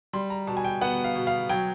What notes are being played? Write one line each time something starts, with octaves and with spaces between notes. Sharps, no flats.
G3 C6
A#5
B2 A5
G#5
G5
B3 F#5
F5
B2
F5
F#3 G5